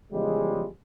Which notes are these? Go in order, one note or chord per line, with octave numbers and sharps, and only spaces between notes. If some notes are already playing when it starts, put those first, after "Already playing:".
E2 C#3 F3 G3 G#3